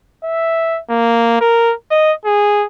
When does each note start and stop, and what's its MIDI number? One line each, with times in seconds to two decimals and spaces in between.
0.24 0.79 76
0.90 1.40 58
1.41 1.74 70
1.91 2.13 75
2.25 2.65 68